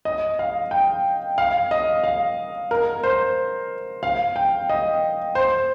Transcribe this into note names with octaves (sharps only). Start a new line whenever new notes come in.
D#5
F5
G5
F5
D#5
F5
A#4
C5
F5
G5
D#5
C5